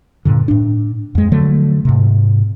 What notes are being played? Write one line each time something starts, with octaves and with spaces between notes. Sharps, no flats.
G2 A#2 D3
A2 D4
F2 G#3
D3 F3 F#3 A3
G#2 C3